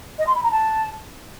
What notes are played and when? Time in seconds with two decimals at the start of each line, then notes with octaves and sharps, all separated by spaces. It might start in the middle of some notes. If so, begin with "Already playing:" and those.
0.19 D#5
0.27 C6
0.35 B5
0.43 A#5
0.52 A5